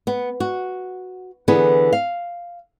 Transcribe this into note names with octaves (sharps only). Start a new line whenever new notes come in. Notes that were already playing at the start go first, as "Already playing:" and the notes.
B3
F#4
D3 E3 B3 G#4 B4
F5